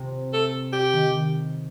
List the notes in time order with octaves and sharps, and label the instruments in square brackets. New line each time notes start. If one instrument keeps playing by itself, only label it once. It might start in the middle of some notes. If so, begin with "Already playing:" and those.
Already playing: [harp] C3
[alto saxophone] A4
G4
[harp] D#3